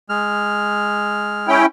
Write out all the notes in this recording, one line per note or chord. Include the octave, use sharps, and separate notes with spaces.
G#3 F6
C#4 E4 G5